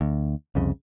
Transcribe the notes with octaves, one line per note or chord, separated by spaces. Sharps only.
D2
C2 F2 C#3